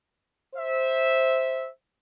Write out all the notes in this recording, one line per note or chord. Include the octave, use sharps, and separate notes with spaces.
C5 E5